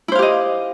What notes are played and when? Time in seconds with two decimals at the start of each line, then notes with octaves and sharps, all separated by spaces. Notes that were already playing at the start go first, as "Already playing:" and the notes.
0.08 E4
0.12 C5
0.15 F5
0.19 G4
0.22 D#5